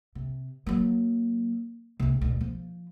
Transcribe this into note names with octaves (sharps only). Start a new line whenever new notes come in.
C3
F#3 A#3
D2 C3
D2 B2
F3